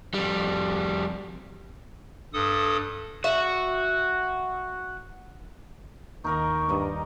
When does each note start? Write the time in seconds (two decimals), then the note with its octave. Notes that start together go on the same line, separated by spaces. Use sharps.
0.14 F2 G3
2.33 G2 A4 D#6
3.24 F#4 E5
6.24 D#2 D#4 A#4 D#5 C#6
6.69 G2 D#4 D5 D#5